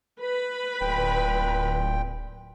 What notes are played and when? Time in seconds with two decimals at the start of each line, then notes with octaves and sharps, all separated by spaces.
0.21 B4 B5
0.81 D1 A#2 G5